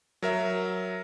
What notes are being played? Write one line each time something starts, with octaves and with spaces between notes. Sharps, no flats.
F#3 A#4 E5